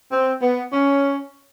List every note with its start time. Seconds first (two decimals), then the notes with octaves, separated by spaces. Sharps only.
0.11 C4
0.42 B3
0.73 C#4